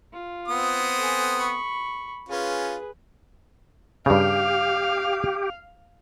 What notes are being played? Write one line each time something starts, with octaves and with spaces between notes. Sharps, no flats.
F4
B3 C4 D#6
A4 G#5
B5 C#6
C#4 F4 G#4 B4
G2 C#3 G4 F5